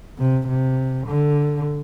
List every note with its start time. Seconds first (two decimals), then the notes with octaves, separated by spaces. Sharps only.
0.18 C3
0.48 C3
1.07 D3